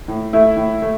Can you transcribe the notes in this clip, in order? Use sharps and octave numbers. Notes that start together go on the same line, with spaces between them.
A2
A3 E4
A2
A3